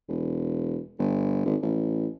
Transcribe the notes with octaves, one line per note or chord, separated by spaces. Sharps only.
E1
G1
G#1
A1